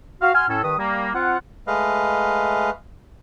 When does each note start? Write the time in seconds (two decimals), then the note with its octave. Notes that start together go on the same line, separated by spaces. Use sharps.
0.21 F#4 F5
0.34 F#4 G#5 C6 F6
0.48 A2 C#4 A4
0.62 G2 D#3 B4 D#6
0.78 G3 A#3
1.14 C4 F4 F#5
1.67 G#3 A3 B4 D#5 F5